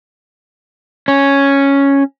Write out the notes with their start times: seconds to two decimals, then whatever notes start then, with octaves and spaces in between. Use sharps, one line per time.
1.08 C#4